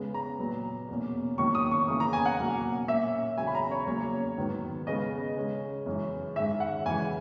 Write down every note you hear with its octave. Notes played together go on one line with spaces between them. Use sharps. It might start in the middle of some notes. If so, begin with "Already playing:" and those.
Already playing: C#3 G#3 B3
A#5
A#2 F#3 B3
E2 B2 A#3 C#4
E2 D#3 F#3 A#3 C#4 C#6
D#6
C#6
E2 C#3 E3 A#3 C#4 D#6
A#5
G#5
F#5
B2 F#3 A#3 C#4
A#2 A#3 C#4 E5
E2 C#3 F#3 C#4 G#5
B5
A#5
C#5
E2 C#3 F#3 A#3 C#4 C#5
G#2 D#3 F#3 B3
C#3 G#3 B3 D#5
C#3 G#3 C#4
F#2 E3 G#3 C#4
G#2 D#3 G#3 C#4 E5
F#5
F#2 C#3 E3 G#3 G#5